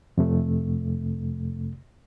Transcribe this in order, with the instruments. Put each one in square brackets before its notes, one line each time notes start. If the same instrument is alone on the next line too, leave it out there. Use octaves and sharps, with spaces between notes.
[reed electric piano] F2 C3 A3